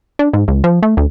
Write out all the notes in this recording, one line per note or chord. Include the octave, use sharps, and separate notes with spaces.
D4
G#2
C#2
F3
A3
D2